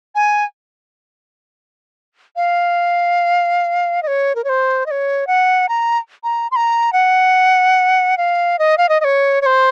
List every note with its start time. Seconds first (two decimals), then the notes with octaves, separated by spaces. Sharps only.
0.15 G#5
2.36 F5
4.03 D#5
4.07 C#5
4.35 A#4
4.44 C#5
4.49 C5
4.86 D#5
4.91 C#5
5.27 F#5
5.69 A#5
6.24 A#5
6.51 C6
6.56 A#5
6.93 F#5
8.17 F5
8.59 D#5
8.78 F5
8.89 D#5
9.01 D#5
9.04 C#5
9.42 C#5
9.46 C5